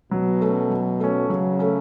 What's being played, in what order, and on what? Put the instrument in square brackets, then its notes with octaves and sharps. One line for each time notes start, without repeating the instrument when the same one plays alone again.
[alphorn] B2 [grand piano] F#3
[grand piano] A3 C#4
F#3
A3 C#4
[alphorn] C#3 [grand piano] F#3
[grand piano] A3 C#4